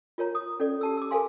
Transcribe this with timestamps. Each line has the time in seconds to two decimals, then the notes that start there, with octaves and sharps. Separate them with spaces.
0.18 F4 A#4 C#5 A#5
0.35 D#6
0.60 C#4 A4 D5
0.81 G4 A5 E6
0.97 D6 E6
1.11 A4 A#4 C5 F5 G#5 C6